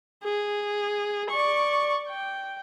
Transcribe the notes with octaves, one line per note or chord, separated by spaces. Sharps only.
G#4
D5 C#6
G5